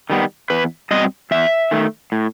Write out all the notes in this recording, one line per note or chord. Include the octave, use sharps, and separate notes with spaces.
D#3 G3 B3
E2 B4
B2 G3 C4 D#5
E2 E5
D#3 A3
A2